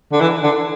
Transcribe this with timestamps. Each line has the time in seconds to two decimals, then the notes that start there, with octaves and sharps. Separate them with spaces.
0.12 D3
0.20 E3
0.43 D3